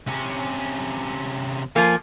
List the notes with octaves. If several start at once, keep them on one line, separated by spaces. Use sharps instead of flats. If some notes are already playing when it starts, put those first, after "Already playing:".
C3 C#4
F3 A#3 G#5